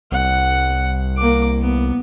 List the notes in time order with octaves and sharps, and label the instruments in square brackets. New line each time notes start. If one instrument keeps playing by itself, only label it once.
[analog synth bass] C2 [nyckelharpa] F#5
[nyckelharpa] A#3 D6
B3